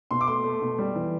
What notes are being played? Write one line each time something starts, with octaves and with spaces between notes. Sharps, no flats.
B2 C6
D6
A3 C6
A3
B2
G3
E3